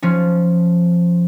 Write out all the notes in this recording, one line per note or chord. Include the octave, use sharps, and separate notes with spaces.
F3 C#4